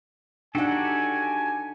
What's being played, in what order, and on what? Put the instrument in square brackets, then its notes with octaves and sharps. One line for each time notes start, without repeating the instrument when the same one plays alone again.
[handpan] D4 D#4 F#5 [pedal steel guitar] F#4 G4 A4 [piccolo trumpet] G#5